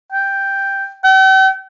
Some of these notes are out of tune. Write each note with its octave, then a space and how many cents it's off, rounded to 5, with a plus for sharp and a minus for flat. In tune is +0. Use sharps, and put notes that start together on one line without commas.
G5 +0
G5 -45